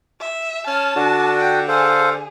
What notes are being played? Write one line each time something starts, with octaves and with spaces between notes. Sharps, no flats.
E5
C#4 A5 F6
D3 D4 F#4
G5
G#4 A4 C5 F5